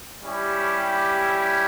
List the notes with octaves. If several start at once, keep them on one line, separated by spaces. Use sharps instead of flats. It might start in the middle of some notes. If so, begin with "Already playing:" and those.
G3 C#4 E4 G4